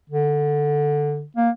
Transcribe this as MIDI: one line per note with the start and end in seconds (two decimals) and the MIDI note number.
0.10 1.25 50
1.36 1.50 58